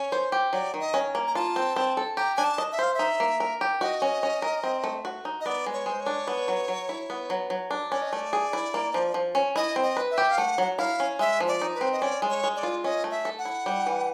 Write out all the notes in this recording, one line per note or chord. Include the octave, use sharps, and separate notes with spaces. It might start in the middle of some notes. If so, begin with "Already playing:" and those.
Already playing: C#4 C#5
C5
G4
F#3 D5
D#3
D#5
C#4
A#3
A#5
F4 A5
C4
C4
A4
G4 A#5
D4 G#5
A5
D#5
E5
C5 F5
E5
D#4
A#3
A#4
G4
F#4 D#5
C#4
C#4
A#4
C4
A3
F#4
D#4
D#5
B3 D5
G#3
C#5
G#3
C5
C#5
D4
B3
F#3
F#3
E4
B3
F#3
F#3
D4
C#4 D5
D#5
A3 D5
G#4
E4
A#3
F3
F3
C#4
E4 D#5
C4
D#5
B4
E5
G4
F5
A3 F#5
F#3
E4 F5
C#4
G#3 E5
F3
D5
D#4
B4
C4
D#5
C#4 D5
G#3
C#5
G#3
D5
F4
C#4 D#5
A3
E5
A4
F#5
E4
G3
E3